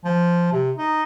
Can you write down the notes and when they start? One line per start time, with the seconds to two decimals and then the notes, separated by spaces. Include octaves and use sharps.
0.04 F3
0.52 C3
0.78 D#4